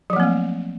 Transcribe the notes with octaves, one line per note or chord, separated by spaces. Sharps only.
F3 F#3 A3 A#3 C4